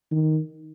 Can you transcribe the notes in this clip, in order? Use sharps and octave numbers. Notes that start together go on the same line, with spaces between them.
D#3